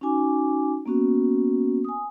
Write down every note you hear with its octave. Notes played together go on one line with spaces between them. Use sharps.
C#4 D#4 F#4 G#5 D6
A#3 B3 C#4 F#4
G#5 D#6